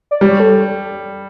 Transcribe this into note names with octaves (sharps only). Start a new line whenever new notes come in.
D5
G3 C#5
A4